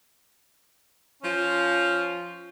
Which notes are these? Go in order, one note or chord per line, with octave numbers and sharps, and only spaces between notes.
F3 C#4 F4